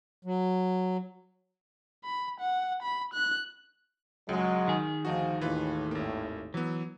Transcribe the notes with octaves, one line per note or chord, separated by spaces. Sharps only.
F#3
B5
F#5
B5
F#6
C#2 F#3 G#3
D#3 G#4
D2 F3 D#4 F#4
D#2 A2 E3 F4 B4
G#1 A#3
E3 F#3 B3